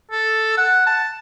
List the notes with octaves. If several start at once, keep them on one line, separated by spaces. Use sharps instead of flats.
A4
F#5
A5